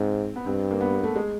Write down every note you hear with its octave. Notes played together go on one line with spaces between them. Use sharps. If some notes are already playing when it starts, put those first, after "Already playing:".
Already playing: G#2 C4
B3
G2 C4
A#3
B3
A#3
A3
G#3